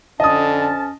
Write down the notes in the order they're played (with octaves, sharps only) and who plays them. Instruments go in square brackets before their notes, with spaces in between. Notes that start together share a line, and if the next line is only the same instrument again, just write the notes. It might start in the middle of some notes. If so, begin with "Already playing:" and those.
[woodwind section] F2 A5 [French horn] D3 [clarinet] C#4 [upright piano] D#5 D#6